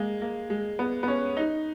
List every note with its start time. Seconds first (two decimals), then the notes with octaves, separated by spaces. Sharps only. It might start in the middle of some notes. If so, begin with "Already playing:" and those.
Already playing: G#3 A#3
0.22 A#3
0.50 G#3
0.79 B3
1.03 B3
1.08 C#4
1.37 D#4